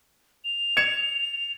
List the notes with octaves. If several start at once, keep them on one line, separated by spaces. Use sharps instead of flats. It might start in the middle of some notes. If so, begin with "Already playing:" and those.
F7
G#6 C#7 E7